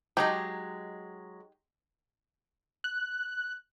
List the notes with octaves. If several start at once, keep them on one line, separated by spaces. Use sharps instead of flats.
F#3 G#3 D#4 G4
F#6